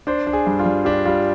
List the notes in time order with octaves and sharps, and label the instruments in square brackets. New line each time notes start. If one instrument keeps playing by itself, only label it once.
[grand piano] D4 C5
D4
G#4
G2
F4
G2
D4 G4
G3 F4